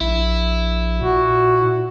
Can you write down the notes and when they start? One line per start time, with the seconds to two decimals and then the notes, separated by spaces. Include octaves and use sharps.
0.01 A#1 E4
1.01 A#2 F#4